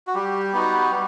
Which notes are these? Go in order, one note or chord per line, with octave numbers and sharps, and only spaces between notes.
F#4
G3 G4
B3 D#4 F#4
G3